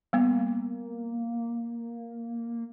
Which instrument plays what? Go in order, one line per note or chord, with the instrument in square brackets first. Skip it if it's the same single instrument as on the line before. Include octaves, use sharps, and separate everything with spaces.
[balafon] G3 B3 [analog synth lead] A#3